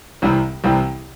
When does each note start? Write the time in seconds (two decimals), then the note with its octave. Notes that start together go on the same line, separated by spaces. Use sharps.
0.22 C2 C3 E3 G3 C4
0.64 C2 C3 E3 G3 C4